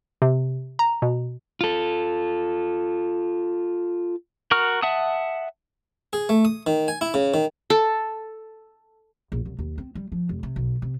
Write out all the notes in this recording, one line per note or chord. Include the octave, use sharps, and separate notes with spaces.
C3
A#5
B2
F4 A4
F#4 A#4 C#6 F6
E5 F#5 A5 D#6
G#4
A3
D#6
D#3
G#5
E4
C#3
D#3
A4
A#1
C2
D#2
C4
G3
F3
F1
C3
B1
C3